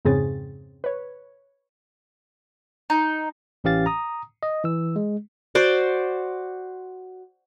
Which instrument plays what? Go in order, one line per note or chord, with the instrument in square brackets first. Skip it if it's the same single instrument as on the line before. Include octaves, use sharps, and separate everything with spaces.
[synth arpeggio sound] F2 G#2 C#3 C4 G#4 A6
B4 C#5
[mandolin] D#4
[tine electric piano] A1 E3 C#4 G4 F5 A6
A#5 D#6
D#5
E3 E6
G#3
[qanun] F#4 C5 D5